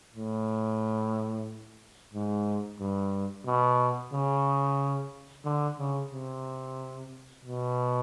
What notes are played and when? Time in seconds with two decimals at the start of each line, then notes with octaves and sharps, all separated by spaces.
0.14 A2
2.14 G#2
2.79 G2
3.46 B2
4.13 C#3
5.45 D3
5.79 C#3
6.12 C3
7.45 B2